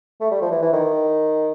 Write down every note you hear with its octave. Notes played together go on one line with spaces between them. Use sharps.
A3
G3
F3
E3
E3
D#3